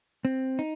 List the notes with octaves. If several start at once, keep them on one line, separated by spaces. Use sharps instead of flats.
C4
D#4